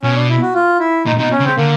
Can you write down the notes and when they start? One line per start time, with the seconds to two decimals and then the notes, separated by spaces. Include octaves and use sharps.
0.03 B2 C#4
0.16 D4
0.29 E4
0.42 F#4
0.54 F4
0.80 E4
1.06 A#2 D#4
1.18 C3 D#4
1.23 B2
1.32 C#4
1.39 C#3
1.44 C4
1.57 D3 A#3